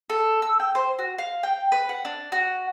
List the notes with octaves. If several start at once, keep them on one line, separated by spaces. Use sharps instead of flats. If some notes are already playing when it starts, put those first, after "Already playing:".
A4
E6
G5
C5
F#4
F5
G5
B4
F#5
D4
F#4